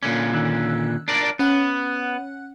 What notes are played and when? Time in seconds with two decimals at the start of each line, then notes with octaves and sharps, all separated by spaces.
0.03 A#2 D3 C#4 D6
0.33 D#3 E6 F#6
1.08 D4 A#4 D5
1.39 B3 C#4 F#5 F#6